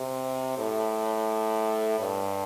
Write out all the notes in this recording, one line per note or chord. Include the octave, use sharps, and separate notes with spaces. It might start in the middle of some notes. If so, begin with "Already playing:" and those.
Already playing: C3
A2
G2